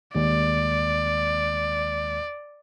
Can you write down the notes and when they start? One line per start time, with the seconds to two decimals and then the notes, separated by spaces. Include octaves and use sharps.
0.15 D#2 G#3 D5